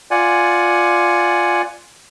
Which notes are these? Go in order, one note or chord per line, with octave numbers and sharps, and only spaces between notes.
F4 D5 F#5 G#5